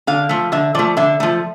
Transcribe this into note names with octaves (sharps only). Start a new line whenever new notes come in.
D3 F5
F3 A3
D3 E5
F3 A3 D5
D3 E5
F3 A3